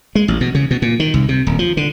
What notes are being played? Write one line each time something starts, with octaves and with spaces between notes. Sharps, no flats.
G#3
A1
B2
C#3
B2
A#2
D#3
C2
C3
D#1
F3
D3